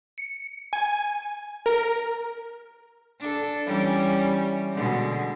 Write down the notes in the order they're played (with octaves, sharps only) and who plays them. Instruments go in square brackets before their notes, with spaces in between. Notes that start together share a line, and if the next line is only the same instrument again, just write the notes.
[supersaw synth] C#7
G#5
A#4
[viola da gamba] D4 A4
E3 G3 C#4
B2 D3 G#3